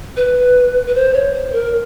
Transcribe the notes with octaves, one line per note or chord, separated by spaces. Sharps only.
B4
B4
C5
C#5
C5
A#4